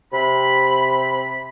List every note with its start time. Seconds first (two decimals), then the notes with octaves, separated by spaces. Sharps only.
0.12 C3 B5